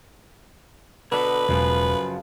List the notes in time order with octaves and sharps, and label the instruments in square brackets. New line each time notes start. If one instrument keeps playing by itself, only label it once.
[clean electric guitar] B2 D3 [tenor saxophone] B4
[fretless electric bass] E1 [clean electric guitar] F#2 C#3 F3